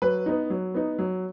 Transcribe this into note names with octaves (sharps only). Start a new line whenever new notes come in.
F#3 B4
B3 D#4
F#3
B3 D#4
F#3